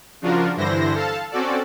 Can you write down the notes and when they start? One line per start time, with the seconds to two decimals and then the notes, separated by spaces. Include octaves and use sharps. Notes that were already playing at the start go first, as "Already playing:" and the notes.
0.21 C#3 F3 D4 F4 F#4 A#4
0.57 G2 D3 E3 E4 C5 A#6
0.94 A4 F5 A5
1.31 C4 C#4 F#4 A4 D5